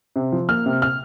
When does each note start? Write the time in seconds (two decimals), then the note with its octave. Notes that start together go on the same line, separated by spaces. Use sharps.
0.16 C3
0.32 F3
0.49 A#3 F6
0.66 C3
0.82 F6